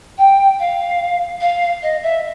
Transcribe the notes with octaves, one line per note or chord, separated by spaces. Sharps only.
G5
F5
F5
D#5
E5